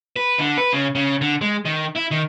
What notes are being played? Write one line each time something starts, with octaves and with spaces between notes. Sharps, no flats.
B4
D3
B4
C#3
C#3
D3
G#3
D#3
E4
D#3